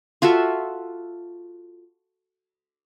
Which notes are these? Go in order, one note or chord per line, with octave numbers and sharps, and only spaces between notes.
F4 F#4 A4 E5